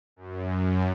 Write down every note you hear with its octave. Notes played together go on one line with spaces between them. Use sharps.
F#2